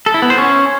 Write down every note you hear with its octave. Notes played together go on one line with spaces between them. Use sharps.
A4
E4
B3
C5
C#4